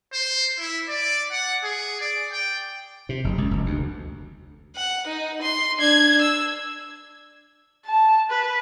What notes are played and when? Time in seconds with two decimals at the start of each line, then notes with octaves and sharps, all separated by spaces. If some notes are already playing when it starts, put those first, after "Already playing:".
0.13 C5
0.59 E4
0.88 D5
1.32 F#5
1.63 G#4
2.01 D5
2.32 G5
3.09 C3
3.24 F#1
3.38 C#2
3.51 F1
3.66 D2
4.76 F#5
5.07 D#4
5.42 C6
5.78 D4 G#6
6.22 E6
7.86 A5
8.30 B4